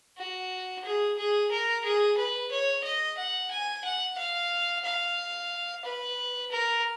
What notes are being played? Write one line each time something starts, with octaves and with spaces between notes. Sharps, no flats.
F#4
G#4
G#4
A#4
G#4
B4
C#5
D#5
F#5
G#5
F#5
F5
F5
B4
A#4